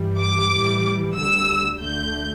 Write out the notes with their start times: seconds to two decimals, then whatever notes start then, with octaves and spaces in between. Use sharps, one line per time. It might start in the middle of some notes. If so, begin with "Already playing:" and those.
Already playing: G2 E3 G3
0.19 D6
0.52 A2 E3 G3
1.16 D2 D3 G3 E6
1.82 D2 D3 A3 G6